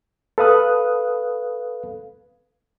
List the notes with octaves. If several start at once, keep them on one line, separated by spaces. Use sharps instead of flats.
A4 B4 F5 D#6 F#6